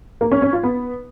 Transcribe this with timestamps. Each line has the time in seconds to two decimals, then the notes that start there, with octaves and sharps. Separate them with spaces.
0.21 A#3
0.32 C#4
0.42 C#4
0.53 F4
0.64 B3